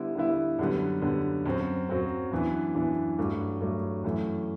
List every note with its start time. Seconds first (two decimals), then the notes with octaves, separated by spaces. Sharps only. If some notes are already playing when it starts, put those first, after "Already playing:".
Already playing: D3 G3 B3 E4
0.15 D3 G3 B3 E4
0.59 F#2 D3 G3 B3
1.02 F#2 D3 G3 B3
1.46 F#2 F#3 C4
1.89 F#2 F#3 C4
2.32 F#2 E3 B3 D4
2.75 F#2 E3 B3 D4
3.19 G2 F#3 A3
3.61 G2 F#3 A3
4.04 F#2 E3 A3